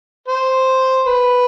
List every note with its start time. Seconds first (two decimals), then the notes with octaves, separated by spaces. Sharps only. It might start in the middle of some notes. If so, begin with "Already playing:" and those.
0.28 C5
1.07 B4